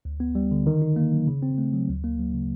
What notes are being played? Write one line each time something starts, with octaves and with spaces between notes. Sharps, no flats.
D2
B3
G3
D3
D#3
D#4
A#3
F#3
C#3
C4
A3
F#3
D2
A#3
F#3
C#3